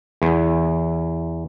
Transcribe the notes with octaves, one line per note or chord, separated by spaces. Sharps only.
E2